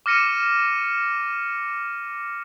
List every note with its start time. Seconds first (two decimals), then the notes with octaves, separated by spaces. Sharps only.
0.06 D6 F6 A#6 C#7 D#7 E7